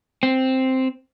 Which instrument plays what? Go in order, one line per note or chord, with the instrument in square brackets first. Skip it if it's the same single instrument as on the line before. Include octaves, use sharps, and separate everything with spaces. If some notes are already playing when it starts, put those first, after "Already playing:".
[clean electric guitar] C4